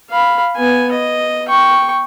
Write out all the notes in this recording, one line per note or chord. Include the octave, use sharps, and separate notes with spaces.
F5 B5
B3 G#5
D#5
G5 C#6